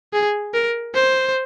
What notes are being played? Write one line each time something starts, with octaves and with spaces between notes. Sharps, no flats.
G#4
A#4
C5